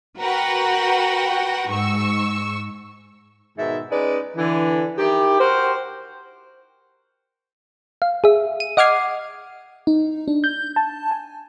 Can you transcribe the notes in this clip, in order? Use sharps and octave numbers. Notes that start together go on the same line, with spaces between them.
F#4 A#4 B4 F#5 G5
G#2 C#6 E6
G#2 B2 D#3 E5
G#3 C#4 D#4 B4 D5
D3 E3
D#3 E4 G4
F#4 G4 A#4 C5
F5
G#4 E5
D#7
D#5 F#5 D6 F6 G#6 C7
D#4
D4
G6
A5
G#5